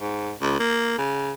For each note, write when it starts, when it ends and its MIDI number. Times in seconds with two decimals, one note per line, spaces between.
0.01 0.32 44
0.41 0.58 37
0.60 0.96 58
0.98 1.32 49